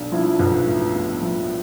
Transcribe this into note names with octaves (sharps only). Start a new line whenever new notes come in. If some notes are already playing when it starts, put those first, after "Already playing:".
Already playing: B1 D4
F3 E4
B1 B3
A2
B1
F3